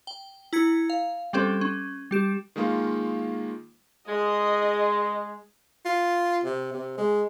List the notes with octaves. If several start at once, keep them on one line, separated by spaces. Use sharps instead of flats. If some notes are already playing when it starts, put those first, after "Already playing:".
G5
E4 A#5 G#6 C#7
F5
G3 C4 C#4 G4 A4 C5
C#4
G3 G4 E7
D#3 G#3 A#3 F4
G#3 D#5
F4
C3
C3
G#3